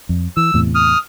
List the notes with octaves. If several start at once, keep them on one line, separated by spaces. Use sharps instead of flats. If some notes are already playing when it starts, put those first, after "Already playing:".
F2
E3 E6
E2 A2 C3
D#6 F6